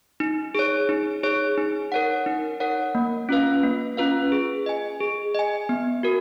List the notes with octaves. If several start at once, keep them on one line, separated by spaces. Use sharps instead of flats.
D#4
G#4 C#5
D#4
G#4 C#5
D#4
A#4 C#5 F#5
D#4
A#4 C#5 F#5
A#3
C#4 F4 B4 F5
A#3
C#4 F4 B4 F5
G#4
D#5 G#5
G#4
D#5 G#5
B3
F#4 A#4